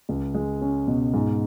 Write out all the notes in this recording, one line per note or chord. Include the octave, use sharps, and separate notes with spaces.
C#2
G#3
C#4
B2
G#2